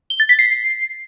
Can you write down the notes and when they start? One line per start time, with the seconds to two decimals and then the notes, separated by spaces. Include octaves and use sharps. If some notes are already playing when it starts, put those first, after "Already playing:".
0.10 G7
0.20 A6
0.29 B6
0.39 C7